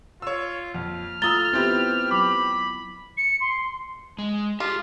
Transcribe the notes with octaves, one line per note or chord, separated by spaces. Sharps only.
F4 C#5 E6
F2 A#2 F6
A3 F4 A#5 D#6 E6 A6 G7
B3 C4 E4 F4 G4 B4
F#3 B5 D6
C#7
C6
G#3
F4 G4 G#4